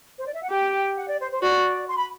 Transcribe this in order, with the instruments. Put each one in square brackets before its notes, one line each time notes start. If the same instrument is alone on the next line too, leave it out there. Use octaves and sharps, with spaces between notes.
[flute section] C5
D5
E5
F#5
[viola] G4 [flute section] G5
[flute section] F#5
D5
C5
C5
[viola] F#4 [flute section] D5
[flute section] C6
B5